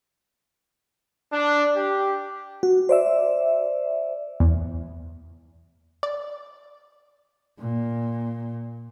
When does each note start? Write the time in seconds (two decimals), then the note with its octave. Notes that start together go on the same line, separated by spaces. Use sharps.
1.33 D4
1.76 G4
2.63 F#4
2.89 C5 D5 E5
4.40 E2
6.03 D5
7.59 A#2